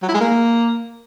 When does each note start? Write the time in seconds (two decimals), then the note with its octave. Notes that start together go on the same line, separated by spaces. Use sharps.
0.02 F#3
0.08 E4
0.14 G#3
0.21 A#3